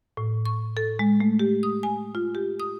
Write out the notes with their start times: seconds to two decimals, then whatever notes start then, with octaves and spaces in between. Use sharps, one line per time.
0.17 A2
0.46 C#6
0.77 A4
0.99 G#3
1.20 A3
1.39 G4
1.63 D#6
1.83 G#5
2.15 F4
2.35 G4
2.60 D#6